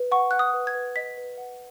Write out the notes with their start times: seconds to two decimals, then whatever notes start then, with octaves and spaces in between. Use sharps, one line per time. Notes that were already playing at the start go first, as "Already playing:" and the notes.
Already playing: B4
0.12 F#5 C#6
0.31 F#5 F#6
0.39 D#6
0.54 B4
0.67 G#6
0.75 B4
0.96 D#5 B6
1.17 B4
1.38 F#5